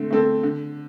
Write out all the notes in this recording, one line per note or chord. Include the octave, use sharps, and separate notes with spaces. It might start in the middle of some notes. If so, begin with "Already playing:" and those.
Already playing: D3 A3 C4
A3 C4 A4
D3